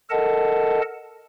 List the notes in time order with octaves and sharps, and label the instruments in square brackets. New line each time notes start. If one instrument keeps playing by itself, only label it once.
[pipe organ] A4 A#4 D#5 F#5 A5